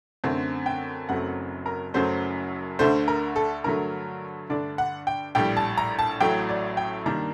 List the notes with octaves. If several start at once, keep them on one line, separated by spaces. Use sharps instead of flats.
F#2 D3 A3 C4
G5
F#1 F#2 F#3 A3 C4 F#5
A#4
F#1 F#2 F#3 A3 C5
D2 D3 A3 C5
A#4
A4
G2 D3 F#3 A3 A#4
G2 D3 A3 D4 D5
F#5
G5
A#1 A2 G3 G5
A5
A#5
A5
A1 A2 F#3 A3 G5
D5
G5
G2 D#3 G3 A#3 D4 A#5